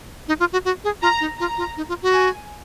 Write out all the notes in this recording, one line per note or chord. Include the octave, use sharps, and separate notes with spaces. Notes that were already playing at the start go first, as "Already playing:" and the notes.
D#4
F4
F#4
F#4
G#4
F4 A#5
D#4
F4 A#5
F4
D#4
F4
F#4
G#5